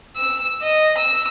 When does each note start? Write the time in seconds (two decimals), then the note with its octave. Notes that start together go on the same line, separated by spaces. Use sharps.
0.16 E6
0.63 D#5
0.98 E6